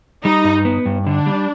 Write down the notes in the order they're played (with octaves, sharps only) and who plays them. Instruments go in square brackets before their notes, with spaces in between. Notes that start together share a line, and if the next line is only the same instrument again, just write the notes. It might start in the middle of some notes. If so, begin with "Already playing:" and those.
[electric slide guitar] G3 [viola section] D#4
[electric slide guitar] G2
B3
G2
[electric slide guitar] D3 [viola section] D4
[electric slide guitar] G3